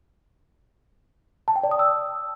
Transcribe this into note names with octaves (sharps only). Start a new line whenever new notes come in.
A5
G5
D5
D#6
E6